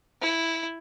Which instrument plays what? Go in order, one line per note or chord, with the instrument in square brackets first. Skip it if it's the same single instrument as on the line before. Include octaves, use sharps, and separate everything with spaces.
[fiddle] E4